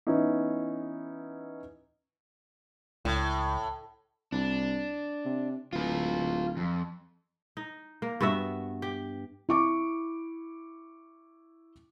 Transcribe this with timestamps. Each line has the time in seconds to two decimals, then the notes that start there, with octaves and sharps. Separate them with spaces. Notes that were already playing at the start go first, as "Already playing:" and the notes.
0.07 E3 B3 C#4 D#4 E4
3.05 C#2 A2
4.32 C2 D4
5.25 C3
5.73 D1 F4 B4
6.57 F2
7.57 D#4
8.02 A#3
8.21 G2 B3 F#4 E5
8.82 G4
9.49 E4 C#6 D6